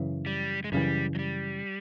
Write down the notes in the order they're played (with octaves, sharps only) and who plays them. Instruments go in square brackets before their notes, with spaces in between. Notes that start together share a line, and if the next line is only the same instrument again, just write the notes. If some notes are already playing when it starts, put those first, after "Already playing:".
Already playing: [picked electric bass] F#2 C#3 E3
[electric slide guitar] G3
G#3
[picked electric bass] F#2 C#3 E3 [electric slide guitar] G3
[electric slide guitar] F#3
G3